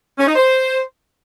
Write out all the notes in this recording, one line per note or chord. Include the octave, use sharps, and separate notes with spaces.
C#4
D#4
C5